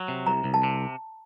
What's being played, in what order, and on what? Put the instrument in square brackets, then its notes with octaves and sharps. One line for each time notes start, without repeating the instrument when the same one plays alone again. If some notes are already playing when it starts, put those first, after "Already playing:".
Already playing: [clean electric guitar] F#3
C3
[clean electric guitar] C2 [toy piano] A#5
[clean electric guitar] C2
[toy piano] A5
[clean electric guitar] C3